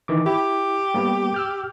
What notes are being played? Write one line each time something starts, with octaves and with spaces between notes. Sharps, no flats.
D#3 E3 D6
E4 G4
G3 A#3 B3
E6 F6 G6